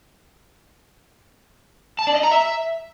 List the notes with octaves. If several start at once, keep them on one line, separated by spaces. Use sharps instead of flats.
A5
D5
D#5
A#5
E5